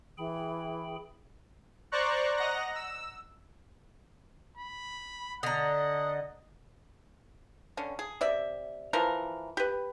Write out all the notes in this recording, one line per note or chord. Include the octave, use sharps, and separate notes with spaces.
E3 G#4 G5 B5
C5 D5 A#5 C#6 F#6
D#5 F#5 A#5 A#6
E6
B5
D3 D#5 F#5 A#5
D3 C#4
G#4
C3 D5 E5
E3 F3 A#4 A#5
G4 B4